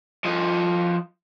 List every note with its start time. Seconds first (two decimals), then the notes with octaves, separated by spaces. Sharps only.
0.25 F3 D#5